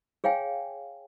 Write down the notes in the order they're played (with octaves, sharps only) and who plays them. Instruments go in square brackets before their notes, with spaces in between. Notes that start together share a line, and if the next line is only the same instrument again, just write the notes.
[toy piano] G#4 C#5 F5 G5 G#5